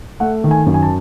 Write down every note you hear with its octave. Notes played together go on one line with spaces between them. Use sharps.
A3 F#5
D#3
G#5
F#2
G#5
A5